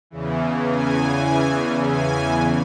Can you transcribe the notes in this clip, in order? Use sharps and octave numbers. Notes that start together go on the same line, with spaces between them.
E2 C#3 E3
G#5
G#5